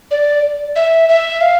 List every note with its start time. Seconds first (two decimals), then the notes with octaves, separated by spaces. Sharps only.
0.11 D5
0.76 E5
1.09 E5
1.41 F5